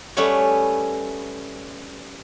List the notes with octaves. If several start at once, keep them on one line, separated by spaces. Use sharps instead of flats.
G3 A3 B3 C#4 B4 C#5